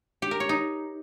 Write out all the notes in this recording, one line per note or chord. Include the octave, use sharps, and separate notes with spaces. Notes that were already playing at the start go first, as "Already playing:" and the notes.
G4
A#4
C#5
D#4